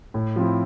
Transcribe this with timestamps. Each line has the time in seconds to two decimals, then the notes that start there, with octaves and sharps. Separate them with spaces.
0.14 A2
0.36 F3 C4 E4